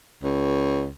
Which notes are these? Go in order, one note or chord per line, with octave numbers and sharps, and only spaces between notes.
C#2